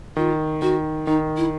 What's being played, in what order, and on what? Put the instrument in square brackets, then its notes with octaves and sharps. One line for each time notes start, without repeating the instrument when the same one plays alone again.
[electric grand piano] D#3 [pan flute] F4
[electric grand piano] D#3 [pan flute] F#4
[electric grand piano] D#3 [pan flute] D#4
[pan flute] E4